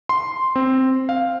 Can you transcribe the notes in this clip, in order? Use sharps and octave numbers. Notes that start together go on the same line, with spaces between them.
C6
C4
F5